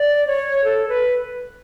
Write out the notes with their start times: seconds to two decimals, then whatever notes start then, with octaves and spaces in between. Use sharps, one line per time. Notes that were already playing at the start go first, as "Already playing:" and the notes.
Already playing: D5
0.27 C#5
0.64 A4
0.89 B4